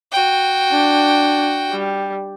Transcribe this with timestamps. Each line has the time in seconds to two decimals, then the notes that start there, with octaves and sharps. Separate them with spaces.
0.12 F#4 G5
0.71 D4
1.72 G3